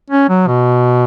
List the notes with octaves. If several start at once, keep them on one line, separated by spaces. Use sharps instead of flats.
C#4
F#3
B2